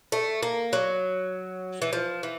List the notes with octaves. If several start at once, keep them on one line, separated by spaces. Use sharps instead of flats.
A3
A#3
F#3
E3
F3
E3